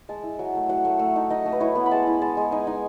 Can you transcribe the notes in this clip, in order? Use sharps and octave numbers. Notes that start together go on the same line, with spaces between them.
G#3 A5
E4
F#3
A3
F#3 F#5
A3 E5
A3
D#4
D#4 D#5
A3
B4
E4 C#5
B3
B5
G#3 A5
E4
G#3 A5
G#3
D#4 G#5
D#4 G#5